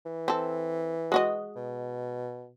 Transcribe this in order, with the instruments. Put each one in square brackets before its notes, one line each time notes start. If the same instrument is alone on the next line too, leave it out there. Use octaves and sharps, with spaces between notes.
[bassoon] E3
[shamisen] C4 A4
G#3 F#4 D#5
[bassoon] B2